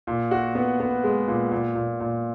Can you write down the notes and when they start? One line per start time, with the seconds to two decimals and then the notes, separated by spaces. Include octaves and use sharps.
0.07 A#2
0.31 F#4
0.55 B3
0.80 B3
1.04 G#3
1.28 A#2
1.51 A#2
1.75 A#2
2.00 A#2